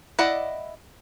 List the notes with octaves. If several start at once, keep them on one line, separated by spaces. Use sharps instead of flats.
E4 D5 D#5 F#5